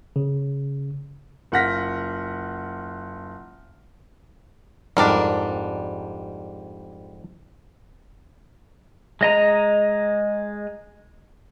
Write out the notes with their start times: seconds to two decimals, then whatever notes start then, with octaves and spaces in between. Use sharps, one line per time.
0.16 C#3
1.52 F#1 F4 F#5 F6 A#6 B6
4.97 F2 G#2 G3 D4 A#4 D5
9.21 G#3 D#5 A#5